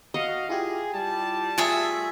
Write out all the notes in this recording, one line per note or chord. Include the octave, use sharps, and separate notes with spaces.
F#4 D#5 F5 F#5
E4 F4 G4 G#4
G3 A5
A3 F4 G#4 E5